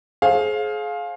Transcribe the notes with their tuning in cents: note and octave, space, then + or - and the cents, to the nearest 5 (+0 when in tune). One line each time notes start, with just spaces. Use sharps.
G#4 +35 C5 +35 F5 +10